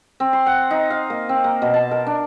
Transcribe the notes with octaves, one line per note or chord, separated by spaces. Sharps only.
C4
C6
F#5
D#4
F5
A#3
C4
A#3
B2
A5
A#4
D4